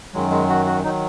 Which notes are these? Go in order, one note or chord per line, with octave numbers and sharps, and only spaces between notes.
F#2 D#3 F#3 G#3
G#3
F#4
F#4
D#3 F#3 D#4